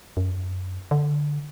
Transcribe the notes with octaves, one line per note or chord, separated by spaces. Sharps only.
F#2
D3